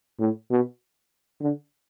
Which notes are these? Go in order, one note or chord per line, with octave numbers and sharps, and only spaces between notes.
A2
B2
D3